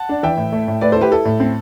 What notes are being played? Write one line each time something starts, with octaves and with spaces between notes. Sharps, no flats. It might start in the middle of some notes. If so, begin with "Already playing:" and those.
Already playing: F#5 A5
D4
E3 E5 G5
A2
A3
A2
A3 B4 D5
E4 A4 C5
G4 B4
E4 A4
A2
C4